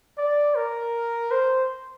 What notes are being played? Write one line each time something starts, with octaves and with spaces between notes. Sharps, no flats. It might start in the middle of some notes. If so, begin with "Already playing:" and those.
D5
A#4
C5